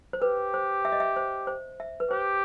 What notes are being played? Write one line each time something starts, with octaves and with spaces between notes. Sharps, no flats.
C5
G4 B4
C5
E5
D#5
E5
C5
C5
E5
B4
G4 C5